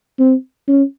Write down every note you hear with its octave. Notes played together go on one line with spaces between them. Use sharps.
C4
C#4